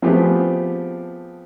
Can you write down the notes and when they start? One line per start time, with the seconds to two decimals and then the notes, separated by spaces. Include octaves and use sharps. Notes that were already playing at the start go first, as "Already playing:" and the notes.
0.02 F3 A3 B3 C4 G4 G#4